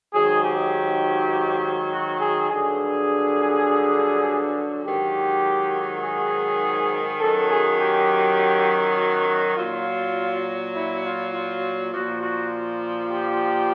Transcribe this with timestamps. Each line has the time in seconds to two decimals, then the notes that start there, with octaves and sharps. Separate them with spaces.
0.13 G#2 D#3 F#3 G#4
0.43 G4
1.91 F#4
2.19 G#4
2.49 G2 D3 F#3 G#4
4.84 G#2 D#3 F#3 G4
6.03 G#4
7.20 F#2 D#3 F#3 A4
7.50 G#4
7.80 G4
8.97 F#4
9.27 F#4
9.57 A#2 F#3 F4
10.74 E4
11.03 F4
11.33 F4
11.92 A#2 F3 F#4
12.22 F#4
13.10 G4